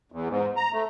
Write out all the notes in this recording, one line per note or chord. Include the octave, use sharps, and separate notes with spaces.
E2
G#2
A#5
A3